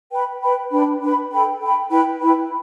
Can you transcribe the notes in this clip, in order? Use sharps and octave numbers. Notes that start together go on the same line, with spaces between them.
B4 G5 B5
B4 G5 B5
D4 B4 G5 B5
D4 B4 G5 B5
A4 G5 B5
A4 G5 B5
E4 B4 G5 B5
E4 B4 G5 B5